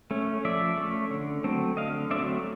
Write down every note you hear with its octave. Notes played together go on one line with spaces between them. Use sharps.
A3 C#4
F3 D5 E5
A3 C#4
D3
F#3 A3 C4
D3 D#5 F5
F#3 A3 C4 D5 E5